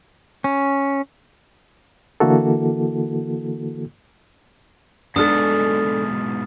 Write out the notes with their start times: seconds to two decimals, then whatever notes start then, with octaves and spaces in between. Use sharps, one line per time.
0.44 C#4
2.20 D3 E3 A#3 E4 F#4 A4
5.16 G#2 B2 D4 A4 D#6 F6 A6